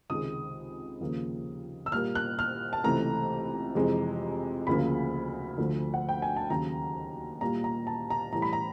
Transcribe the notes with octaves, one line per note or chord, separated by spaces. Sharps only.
C#2 C3 D#3 G#3 D#6
D#2 C#3 F3 A#3
E6
A#2 G3 A#3 F6
F#6
F6
A5
C#2 C3 E3 A3 A#5
F2 C3 E3 G#3
D2 C#3 F3 A#3 B5
D2 D3 F3 A3
F#5
G5
G#5
A5
D#2 C#3 F#3 A#5
A#2 G3 A#3 A#5
A#5
A5
A#5
A2 E3 G3 A#5
B5
A#5